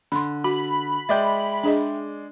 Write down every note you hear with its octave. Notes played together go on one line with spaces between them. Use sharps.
D3 B5 C6
F#4 B5
G#3 D5 E5 G5 G6
D4 G#4 D#5